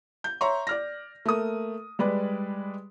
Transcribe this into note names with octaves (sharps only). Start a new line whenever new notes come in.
G6
C#5 E5 A#5 C6 C#6
D5 F6 A#6
A3 A#3 D#6
G3 G#3 B4 D5